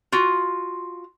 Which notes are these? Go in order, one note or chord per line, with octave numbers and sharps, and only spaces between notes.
F4 F#4